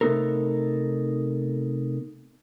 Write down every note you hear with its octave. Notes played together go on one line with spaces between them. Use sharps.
C3 A3 B3 D#4 A4 A#4